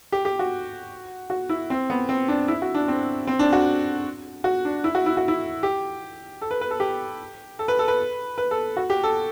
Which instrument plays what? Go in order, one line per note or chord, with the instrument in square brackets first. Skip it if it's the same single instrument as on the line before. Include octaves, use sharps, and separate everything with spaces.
[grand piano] G4
G4
F#4
F#4
E4
C4
B3
C4
D4
E4
F#4
D4
C4
C4
D4
F#4
F#4
D4
E4
F#4
E4
F#4
E4
G4
A4
B4
B4
A4
G4
A4
B4
A4
B4
B4
A4
F#4
G4
A4